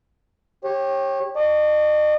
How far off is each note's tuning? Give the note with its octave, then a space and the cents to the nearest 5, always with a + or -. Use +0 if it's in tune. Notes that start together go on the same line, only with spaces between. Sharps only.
G4 +0 C#5 -25
D#5 -40 A5 +0 C#6 +35